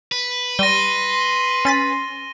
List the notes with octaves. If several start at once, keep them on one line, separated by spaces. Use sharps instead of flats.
B4
G3 C6 A#6 D#7 G7
C#4 A6 B6